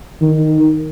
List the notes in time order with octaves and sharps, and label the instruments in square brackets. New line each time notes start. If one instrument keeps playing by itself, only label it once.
[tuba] D#3